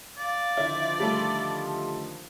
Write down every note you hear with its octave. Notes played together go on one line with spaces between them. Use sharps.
D5 F5
D3 D#3 F3 E4 C5
G3 A3 A4 A5